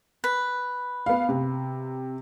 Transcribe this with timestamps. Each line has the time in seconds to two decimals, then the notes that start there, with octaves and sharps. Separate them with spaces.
0.24 B4
1.06 B3 F5
1.29 C3